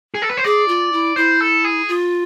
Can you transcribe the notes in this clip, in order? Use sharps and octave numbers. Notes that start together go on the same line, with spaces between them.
G#4
A4
B4
C5
G#4 D5
F4
E4
E4 C5
A4
G#4
F4